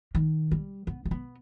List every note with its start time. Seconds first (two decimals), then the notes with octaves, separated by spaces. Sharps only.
0.15 D#3
0.51 G3
0.87 B3
1.05 G#3
1.11 B3